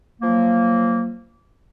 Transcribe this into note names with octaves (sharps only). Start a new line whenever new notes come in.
F3 F#3 A#3